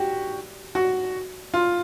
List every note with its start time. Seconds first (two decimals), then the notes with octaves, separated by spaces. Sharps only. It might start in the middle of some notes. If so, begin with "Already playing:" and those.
Already playing: F#4 G4
0.75 F#4
1.54 F4